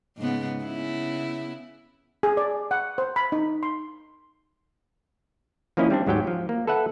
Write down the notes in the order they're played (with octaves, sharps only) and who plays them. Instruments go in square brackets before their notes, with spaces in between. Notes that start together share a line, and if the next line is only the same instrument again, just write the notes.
[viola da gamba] G#2 C#3 B3
C#3 B3 E4
[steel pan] G#4
D5
F#5
C5
B5
D#4
C6
[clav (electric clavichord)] F3 A#3 C#4 E4 D#5 G#5
G3 C4 D4
D2 G#2 F#3 G4 G5
F3
A#3
A4 B4 E5 F#5